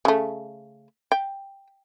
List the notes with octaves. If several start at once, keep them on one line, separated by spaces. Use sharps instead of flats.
C#3 A3
G5